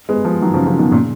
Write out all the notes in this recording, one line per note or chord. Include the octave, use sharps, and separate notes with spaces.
G#3 B3
F3 G#3
D#3 F#3
C#3 F3
C#3 F3
B2 D#3
A#2 C#3